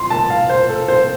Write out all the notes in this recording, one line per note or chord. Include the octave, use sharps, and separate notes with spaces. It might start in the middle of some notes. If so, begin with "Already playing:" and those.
Already playing: F3 C6
A5
F5
C5
A4
C5